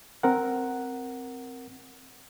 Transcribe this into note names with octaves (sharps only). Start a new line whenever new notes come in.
C4 A#4 F#5